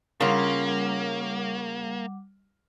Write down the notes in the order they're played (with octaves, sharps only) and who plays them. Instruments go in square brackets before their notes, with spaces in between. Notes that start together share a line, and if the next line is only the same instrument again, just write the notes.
[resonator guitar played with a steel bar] C#3 F4 [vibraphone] G3 F#5 D6 [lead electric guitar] A#3 [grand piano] C#4 A#4